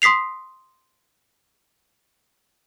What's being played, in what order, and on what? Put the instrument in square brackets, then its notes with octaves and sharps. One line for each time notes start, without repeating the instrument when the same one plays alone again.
[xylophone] C6 D#6 B6 C7 F7